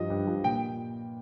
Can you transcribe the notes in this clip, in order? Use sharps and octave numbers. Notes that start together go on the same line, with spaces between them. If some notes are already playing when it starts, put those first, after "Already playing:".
Already playing: G2 F3 D#5
G2
F3
A#2 G5